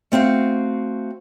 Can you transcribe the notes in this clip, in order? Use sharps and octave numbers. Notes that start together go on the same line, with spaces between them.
A3 C4 F#4 F5